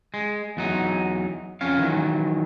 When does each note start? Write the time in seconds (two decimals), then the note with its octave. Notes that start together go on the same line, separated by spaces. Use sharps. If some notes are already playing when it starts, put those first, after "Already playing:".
0.14 G#3
0.57 E2 F#3 D#4
1.61 F2 C#4 C#5 F5
1.79 D#3 E3 F#3